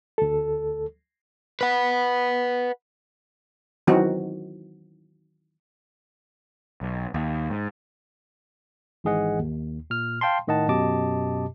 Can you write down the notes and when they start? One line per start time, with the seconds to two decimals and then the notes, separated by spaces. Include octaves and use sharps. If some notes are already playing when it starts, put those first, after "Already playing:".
0.18 D2 A4
1.61 B4 F#5
3.87 D#3 E3 F#3 C4 D#4 F#4
6.81 B1
7.14 D#2
7.50 G#2
9.04 G#1 G#2 E3 G#4 D#5 F#5
9.39 D#2
9.90 A#2 F6
10.21 F5 G5 A5 C6
10.47 A2 D#3 D#5 F#5 A5
10.68 F#2 B2 G4 D#5 A5 D6